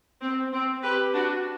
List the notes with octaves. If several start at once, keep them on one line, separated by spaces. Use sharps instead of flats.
C4
C4
G4 B4
D4 F#4